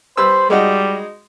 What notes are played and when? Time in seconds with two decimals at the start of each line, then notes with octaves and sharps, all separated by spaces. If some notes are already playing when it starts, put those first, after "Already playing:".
0.17 G3 B4 C5 E6
0.50 G3 G#3 D#4 F#4